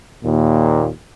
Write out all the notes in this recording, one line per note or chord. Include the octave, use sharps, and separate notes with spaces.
D#2 A#2